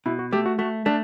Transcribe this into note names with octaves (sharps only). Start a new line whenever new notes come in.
B2 E4
F#4
A3 G4
F#4
A3 F#4
A3 D4